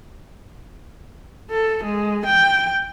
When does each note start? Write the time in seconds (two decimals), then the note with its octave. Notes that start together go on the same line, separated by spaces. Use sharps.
1.50 A4
1.84 G#3
2.25 G5